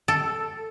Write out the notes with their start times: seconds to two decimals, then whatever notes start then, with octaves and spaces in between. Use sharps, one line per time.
0.08 A4